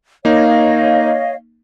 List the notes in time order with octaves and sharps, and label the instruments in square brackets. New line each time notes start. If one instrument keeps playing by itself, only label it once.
[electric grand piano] A#3 D#4 [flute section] C#5 D#5 F5